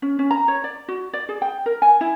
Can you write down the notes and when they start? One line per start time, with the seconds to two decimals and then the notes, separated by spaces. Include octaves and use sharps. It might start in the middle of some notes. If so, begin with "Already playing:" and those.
0.02 C#4
0.19 C#4
0.31 A#5
0.48 C#5
0.64 D5
0.88 F#4
1.13 D5
1.29 G#4
1.42 G5
1.66 A#4
1.82 G#5
2.01 E4